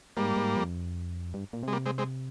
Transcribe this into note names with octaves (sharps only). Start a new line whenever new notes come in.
G#2 G3 A#3
G#2
F2
G2
A#2
C3 G#3
G3 A#3
G#3 C4
G#3 C4